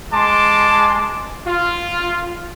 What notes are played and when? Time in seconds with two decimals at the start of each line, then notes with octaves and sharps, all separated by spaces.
0.13 G#3 A5 C6 D6
1.46 F4